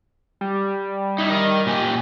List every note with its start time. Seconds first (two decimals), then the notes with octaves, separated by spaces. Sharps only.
0.41 G3
1.18 D#4 E4
1.30 A#4 D#5
1.66 A#2 G4 G#5